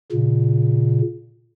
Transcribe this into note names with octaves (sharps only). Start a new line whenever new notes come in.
A#2 C#3